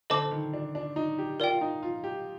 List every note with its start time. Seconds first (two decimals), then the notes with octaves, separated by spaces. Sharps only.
0.10 D3 A4 C5 D#5 A5 D6
0.31 D#3
0.53 D4
0.75 D4
0.96 D#4
1.18 G4
1.40 F4 A#4 D5 G5
1.51 F4
1.61 D#4
1.83 F4
2.04 G4